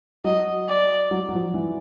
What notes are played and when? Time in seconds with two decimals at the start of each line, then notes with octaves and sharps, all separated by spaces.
0.24 F#3 D#5
0.68 D5
1.11 F#3
1.29 F#3
1.33 F3
1.54 E3